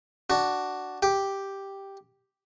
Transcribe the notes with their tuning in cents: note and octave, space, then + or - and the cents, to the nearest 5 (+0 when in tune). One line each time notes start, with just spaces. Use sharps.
D4 +0 F#4 +5
G4 +0 G5 +0